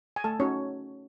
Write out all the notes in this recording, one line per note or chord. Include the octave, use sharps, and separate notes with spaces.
G#5
A3 A4 A5
C#4 D#4 F#4 C#5